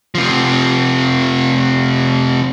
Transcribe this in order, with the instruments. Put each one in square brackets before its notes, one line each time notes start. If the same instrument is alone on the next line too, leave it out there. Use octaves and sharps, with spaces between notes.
[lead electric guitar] C3 F3